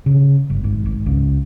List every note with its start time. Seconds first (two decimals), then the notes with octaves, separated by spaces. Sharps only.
0.06 C#3
0.50 G1
0.64 G#1
0.86 G#1
1.06 C#2